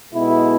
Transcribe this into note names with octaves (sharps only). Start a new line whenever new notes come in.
B1 B2 G#3 B3 E4